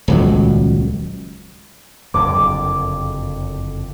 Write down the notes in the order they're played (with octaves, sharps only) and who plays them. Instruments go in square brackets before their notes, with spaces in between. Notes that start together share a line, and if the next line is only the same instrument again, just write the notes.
[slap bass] D#1 C#2 F#3
[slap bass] F#1 F2 D3 [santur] D6